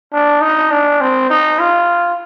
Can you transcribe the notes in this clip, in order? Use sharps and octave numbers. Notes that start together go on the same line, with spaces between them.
D4
D#4
D4
C4
D#4
F4